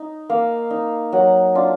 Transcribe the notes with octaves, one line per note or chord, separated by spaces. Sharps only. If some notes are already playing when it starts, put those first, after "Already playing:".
Already playing: D#4
A#3 F5
D#4
F#3 F#5
D4 F4